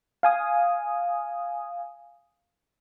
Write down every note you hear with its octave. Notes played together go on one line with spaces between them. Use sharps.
F5 G#5 D#6